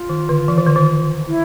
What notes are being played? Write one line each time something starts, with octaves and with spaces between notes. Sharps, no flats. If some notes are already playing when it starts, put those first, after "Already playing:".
Already playing: F4
D#3
D3
E3
D#3
D3
D#3
E4